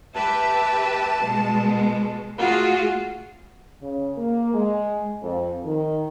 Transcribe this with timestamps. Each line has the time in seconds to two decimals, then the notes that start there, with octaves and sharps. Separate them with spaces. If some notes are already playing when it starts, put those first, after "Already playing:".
0.15 G4 B4 E5 A5
1.23 B2 G#3 B3
2.38 A3 F4 F#4 G#4
3.82 C#3
4.17 A#3
4.53 G#3
5.22 F2
5.63 D#3